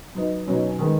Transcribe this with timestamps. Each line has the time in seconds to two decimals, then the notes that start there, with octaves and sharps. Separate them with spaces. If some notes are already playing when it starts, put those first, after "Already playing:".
0.15 F#3 D#4 B4
0.47 B2 F#3 C#4 D#4 B4
0.79 D#3 G#3 C#4 B4